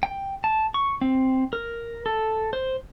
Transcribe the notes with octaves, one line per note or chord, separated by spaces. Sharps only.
G5
A5
C#6
C4
A#4
A4
C5